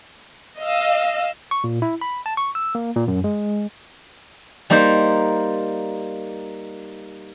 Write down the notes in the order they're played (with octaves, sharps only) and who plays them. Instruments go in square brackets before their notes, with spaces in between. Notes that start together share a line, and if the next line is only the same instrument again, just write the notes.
[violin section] D#5 F5 E6
[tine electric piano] C#6
A#2
E4
B5
A5
C#6
E6
A#3
A#2
F#2
G#3
[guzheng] G3 A#3 D#4 C5